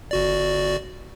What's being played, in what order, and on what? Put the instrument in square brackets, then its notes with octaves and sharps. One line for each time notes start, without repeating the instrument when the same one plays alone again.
[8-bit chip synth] G1 F#4 D5